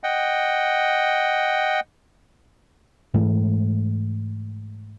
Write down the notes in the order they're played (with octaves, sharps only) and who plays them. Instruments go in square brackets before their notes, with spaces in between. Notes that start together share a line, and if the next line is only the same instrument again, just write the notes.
[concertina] D#5 F#5 G5
[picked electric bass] G#2 E3 G#3 A3